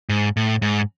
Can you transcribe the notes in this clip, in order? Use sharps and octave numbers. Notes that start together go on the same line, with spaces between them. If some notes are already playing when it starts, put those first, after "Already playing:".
G#2
A2
G#2